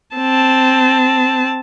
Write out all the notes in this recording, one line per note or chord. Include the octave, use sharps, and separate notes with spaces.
C4 A5